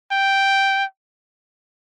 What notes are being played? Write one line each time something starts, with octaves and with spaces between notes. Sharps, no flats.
G5